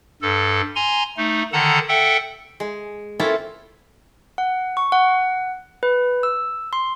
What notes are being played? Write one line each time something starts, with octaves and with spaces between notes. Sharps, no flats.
G2 A4
G#5 A#5 C6
A3 D#4
D3 D#3 A4 F#5 A5 A#5
A4 E5 F#5 G5
G#3
A#3 C4 C#4 E4 F4 A4
F#5
C#6
F#5
B4
E6
C6